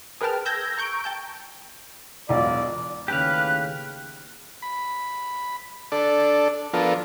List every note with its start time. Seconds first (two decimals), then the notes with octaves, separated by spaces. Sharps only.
0.21 G#4 A#4 B4 G5 A5 F6
0.45 E6 G6 G#6 A#6
0.78 A#5 C#6 G6 D7
1.04 G5 A5 G6
2.29 E1 B1 F4 D5
3.08 D#2 A2 C#3 G4 B4 F5 F#6
4.62 B5
5.92 D4 A4 D5
6.74 F3 B3 D4 F4 A4 A#4